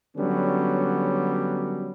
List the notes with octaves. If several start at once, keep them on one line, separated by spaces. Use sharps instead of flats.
D3 F#3 G3 B3 C#4